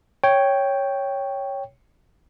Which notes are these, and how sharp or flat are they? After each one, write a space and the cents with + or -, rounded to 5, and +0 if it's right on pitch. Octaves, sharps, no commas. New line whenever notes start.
C#5 +0 G5 +0